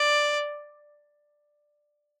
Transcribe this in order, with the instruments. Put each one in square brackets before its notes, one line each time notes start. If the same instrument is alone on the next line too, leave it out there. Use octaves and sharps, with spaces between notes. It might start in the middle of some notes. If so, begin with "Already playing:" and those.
Already playing: [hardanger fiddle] D5